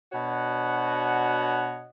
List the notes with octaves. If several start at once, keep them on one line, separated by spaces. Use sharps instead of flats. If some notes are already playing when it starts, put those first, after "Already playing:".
B2 D4 F#4 C#5 D#5 F#5